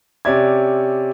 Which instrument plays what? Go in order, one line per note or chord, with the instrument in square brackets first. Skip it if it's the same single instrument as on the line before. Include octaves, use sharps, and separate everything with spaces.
[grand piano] C3 C#4 D5 E5 G#6